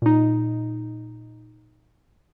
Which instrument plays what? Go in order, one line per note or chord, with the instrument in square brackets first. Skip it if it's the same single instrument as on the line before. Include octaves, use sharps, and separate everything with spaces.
[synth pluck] A#2 D#4